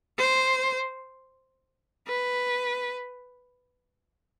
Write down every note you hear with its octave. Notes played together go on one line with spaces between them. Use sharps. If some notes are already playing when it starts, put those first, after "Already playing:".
C5
B4